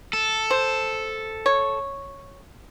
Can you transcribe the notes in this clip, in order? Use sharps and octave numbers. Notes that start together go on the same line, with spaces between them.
A4
C5
C#5